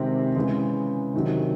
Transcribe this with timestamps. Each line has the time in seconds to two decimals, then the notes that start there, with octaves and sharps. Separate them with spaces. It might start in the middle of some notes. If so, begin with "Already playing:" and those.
Already playing: C3 D#3 G#3 C4
0.36 C#3 E3 G#3
1.14 C3 D#3 F#3